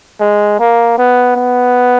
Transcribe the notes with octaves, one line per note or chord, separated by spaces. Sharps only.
G#3
A#3
B3
B3